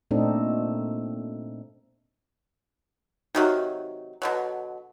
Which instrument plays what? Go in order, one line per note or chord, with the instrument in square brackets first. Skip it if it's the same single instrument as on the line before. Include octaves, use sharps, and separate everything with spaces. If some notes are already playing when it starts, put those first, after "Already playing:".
[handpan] A#2 A3 C4 D4 D#4 A4
[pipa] C3 D#3 F#3 [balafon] D#4 F#4
[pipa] B2 D3 F#3